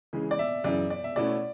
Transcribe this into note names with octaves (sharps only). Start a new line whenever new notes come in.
C#3 E3 G#3
D5
E5
F#2 C#3 E3 D5
D5
E5
B2 A3 C#4 E4 D5